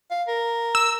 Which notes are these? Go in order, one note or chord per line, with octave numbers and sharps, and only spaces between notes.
F5
A#4
E6